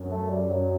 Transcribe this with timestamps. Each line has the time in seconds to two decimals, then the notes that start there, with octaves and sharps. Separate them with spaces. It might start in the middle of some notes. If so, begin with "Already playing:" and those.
Already playing: F#2
0.11 A3
0.30 G3
0.49 F#2 F#3